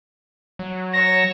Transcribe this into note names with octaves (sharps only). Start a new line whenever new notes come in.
F#3
C#5 A#6 E7